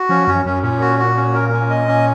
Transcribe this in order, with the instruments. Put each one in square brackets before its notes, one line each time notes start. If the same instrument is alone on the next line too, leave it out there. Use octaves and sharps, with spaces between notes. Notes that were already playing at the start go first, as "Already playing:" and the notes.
Already playing: [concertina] F#4
[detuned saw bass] F3 [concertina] C#4
[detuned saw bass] F#2 [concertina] C#4
[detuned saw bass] F#2 [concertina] C#4
[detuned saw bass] A#2 [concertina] C#4
[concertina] F#4
F#4
C#4
A#4
C#4
D#5
C#4